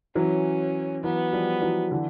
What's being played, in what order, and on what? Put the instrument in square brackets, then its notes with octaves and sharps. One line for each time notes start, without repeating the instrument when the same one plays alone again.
[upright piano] E3 F#3 [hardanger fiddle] C#4
[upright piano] E3 F#3 [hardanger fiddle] B3
[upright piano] F3 G3
E3 F#3
D3 E3